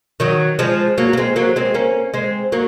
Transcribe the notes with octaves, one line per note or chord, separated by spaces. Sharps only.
D#3 F#3
F3 G#3
F#3 A#3
A#3
G#3 C4
F#3 A#3
G#3 C4
A#3 C#4
G#3 C4
F#3 A#3